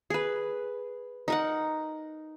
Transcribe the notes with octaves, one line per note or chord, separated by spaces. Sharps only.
G#4 B4
D#4 A#4 F#5